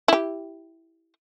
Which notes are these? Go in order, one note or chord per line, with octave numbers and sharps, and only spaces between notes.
E4 G4